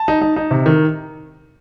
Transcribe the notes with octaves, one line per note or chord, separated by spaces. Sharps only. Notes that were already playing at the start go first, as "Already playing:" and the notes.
Already playing: A5
D#4
D#4
D#4
C3
D#3